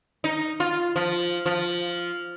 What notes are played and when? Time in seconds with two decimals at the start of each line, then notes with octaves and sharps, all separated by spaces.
0.24 D#4
0.60 F4
0.96 F3
1.46 F3